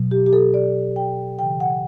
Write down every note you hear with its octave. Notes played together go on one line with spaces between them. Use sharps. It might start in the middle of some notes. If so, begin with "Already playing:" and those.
Already playing: B2 F#3
G4
G4
A4
D5
G5
C#3 E3 G5
F#5